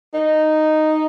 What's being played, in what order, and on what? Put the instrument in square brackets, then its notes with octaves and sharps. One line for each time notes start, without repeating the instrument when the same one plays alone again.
[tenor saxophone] D#4